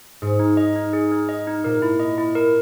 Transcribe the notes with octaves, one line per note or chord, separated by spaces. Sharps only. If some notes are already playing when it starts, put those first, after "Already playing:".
G#2 G#4
D#4
D#5
D#4
G#4
D#4
D#5
D#4
A#2 A#4
E4
D#5
E4
A#4